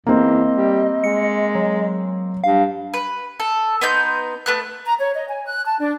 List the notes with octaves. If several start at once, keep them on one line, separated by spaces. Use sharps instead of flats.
E2 A#3 C4 D#5
G3
G#3 C#7
F#3
G2 F5
B4
A4
B3 D#4 C6 G6
A3 B3 F#6
A#5
C#5
D#5
G#5
F#6
A5
D4